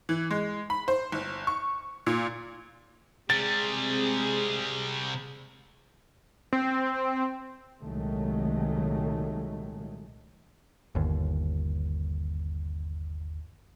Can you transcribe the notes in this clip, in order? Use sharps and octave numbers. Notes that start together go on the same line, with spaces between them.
E3
G#3
B5
C5
G1
C#6
A#2
C3 G3 G#3 C4 G#4 A6
C4
C2 A#2 D#3 F#3 G#3 A3
G1 D#2